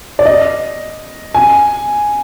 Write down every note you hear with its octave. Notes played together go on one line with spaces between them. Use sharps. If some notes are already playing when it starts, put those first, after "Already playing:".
D5
D#5
G#5